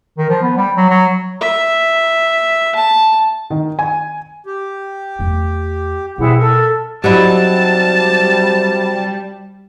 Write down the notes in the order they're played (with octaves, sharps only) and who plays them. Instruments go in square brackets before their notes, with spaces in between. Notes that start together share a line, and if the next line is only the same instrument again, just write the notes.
[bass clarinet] D#3
F3
B3
G3
F#3
F#3
[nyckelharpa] E5
A5
[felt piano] D#3
G#5
[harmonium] G4
[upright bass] E2 A3
[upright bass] B2 [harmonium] E3 G3 C4 [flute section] E4 G#4 F#5
[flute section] A4 E6 [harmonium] A#4 E5
[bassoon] C3 [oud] F#3 D#4 E4 [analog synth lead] G3 [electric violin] A5